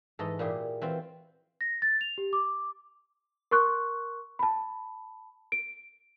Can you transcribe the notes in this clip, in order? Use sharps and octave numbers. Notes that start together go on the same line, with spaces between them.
G#2 E3 A4 D#5
A#2 E4 G4 G#4
E3 C4 F4 F#4
A#6
A6
F7
G4
D6
A#4 C6 C#6 F#6
A5 B5
D7